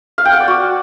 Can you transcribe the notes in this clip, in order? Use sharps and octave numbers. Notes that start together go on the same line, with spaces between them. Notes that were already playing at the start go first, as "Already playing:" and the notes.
F5
G5
F#5
D5
F#4